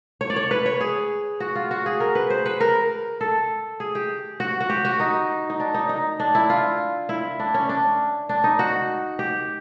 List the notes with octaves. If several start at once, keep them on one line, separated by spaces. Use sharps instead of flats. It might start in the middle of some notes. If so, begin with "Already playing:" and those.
C#5
D5
C#5
B4
C#5
G#4
F#4
F4
F#4
G#4
A#4
B4
C5
B4
A#4
A4
G#4
G4
F#4
F#4
G4
F#4
D#4
D#4
D4
D#4
D#4
D4
E4
F4
E4
D4
C#4
D4
D4
D#4
F#4
G4